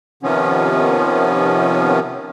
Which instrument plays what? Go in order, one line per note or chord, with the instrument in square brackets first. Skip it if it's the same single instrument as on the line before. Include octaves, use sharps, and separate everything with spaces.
[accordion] C3 D#3 F3 B3 C#4